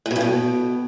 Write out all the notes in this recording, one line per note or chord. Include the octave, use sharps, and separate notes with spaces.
A2
B2
G2
B2